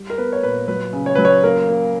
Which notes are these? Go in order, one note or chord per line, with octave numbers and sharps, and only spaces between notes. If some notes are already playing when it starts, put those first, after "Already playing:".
Already playing: G3
A#4
B3 B4
C#5
A#2 B4
F#3 B4
C#3
C#5
F#3 B4
C#5
A#3 A#4
A#3